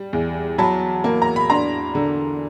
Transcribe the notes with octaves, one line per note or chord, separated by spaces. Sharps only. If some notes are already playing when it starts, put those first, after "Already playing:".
Already playing: G3
E2
F#3 A5 B5
A#3
A#5
B5
D4 A#5 C6
D3